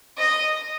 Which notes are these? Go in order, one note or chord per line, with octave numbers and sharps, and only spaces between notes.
D#5